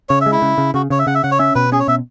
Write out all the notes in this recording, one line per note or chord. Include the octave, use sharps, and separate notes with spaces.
C#3 C#5
E5
G#3
E4
C#3
C#3
C#3 F#4
C#3 C#5
E5
C#3 F#5
E5
C#3 F#5
C#5
C#4 E5
B2 B4
C#4 G#4
C#5
B2 E5